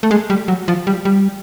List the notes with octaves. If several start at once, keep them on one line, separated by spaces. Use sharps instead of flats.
A3
G#3
G3
F#3
F3
G3
G3